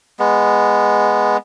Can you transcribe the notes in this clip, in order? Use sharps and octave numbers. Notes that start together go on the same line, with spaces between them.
G#3 B3